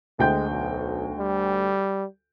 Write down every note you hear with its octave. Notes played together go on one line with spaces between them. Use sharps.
D2 G#3 G5 G6
B1
G3